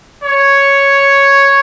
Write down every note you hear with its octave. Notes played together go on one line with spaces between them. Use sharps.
C#5